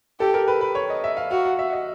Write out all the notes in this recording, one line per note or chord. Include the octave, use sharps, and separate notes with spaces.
G4 A4
A#4
B4
B4
C#5
D#5
E5
F5
F#4 F5
F#5
E5
D#5